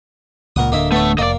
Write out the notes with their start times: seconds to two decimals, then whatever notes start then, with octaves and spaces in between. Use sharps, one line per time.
0.56 C#2 A#2 A#4 F#5 D#6
0.72 D1 D3 A#3 D#5 E5
0.92 A3 B3 C#5
1.18 F1 A#3 D5 D#5